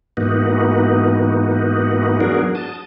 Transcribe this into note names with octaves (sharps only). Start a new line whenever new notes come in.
G#2 E3 A#3 B3 D#4 F#4
F#3 B3 D4 F#4 G#4 A#4
A5 D#6